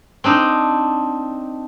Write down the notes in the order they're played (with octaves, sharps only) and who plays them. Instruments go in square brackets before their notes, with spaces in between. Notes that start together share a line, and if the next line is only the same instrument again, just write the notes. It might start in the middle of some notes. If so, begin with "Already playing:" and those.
[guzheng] C4 D4 D#4